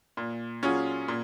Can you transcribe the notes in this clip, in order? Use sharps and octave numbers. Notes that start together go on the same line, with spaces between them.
A#2
F#3 C#4 F4 G#4
A#2